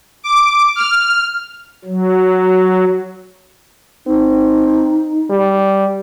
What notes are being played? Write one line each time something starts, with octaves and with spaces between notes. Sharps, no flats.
D6
F6
F#3
C4 D#4
G3